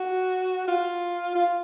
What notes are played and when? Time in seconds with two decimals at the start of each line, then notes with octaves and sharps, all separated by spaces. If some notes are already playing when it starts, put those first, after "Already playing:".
Already playing: F#4
0.68 F4
1.35 F4